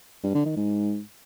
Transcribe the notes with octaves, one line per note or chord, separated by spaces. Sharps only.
G2
D3
D#3
G#2